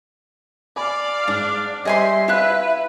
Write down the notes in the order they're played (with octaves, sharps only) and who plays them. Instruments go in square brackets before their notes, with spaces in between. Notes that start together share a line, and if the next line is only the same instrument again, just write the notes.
[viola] D5 F5 [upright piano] G#5 B5 D6
[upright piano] G#2 [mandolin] D4
[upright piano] G3 [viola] C5 [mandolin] D#5 G#5 C6 [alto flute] E5
[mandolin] E4 F#6 [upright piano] F4 [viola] B4